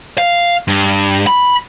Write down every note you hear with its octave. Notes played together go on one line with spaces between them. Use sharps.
F5
G2
B5